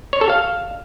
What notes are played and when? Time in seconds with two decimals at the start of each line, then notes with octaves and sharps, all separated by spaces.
0.13 C#5
0.21 A4
0.30 F5